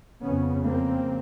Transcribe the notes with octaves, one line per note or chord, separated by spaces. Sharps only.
F2 C#3 B3 C#4
A#3 C4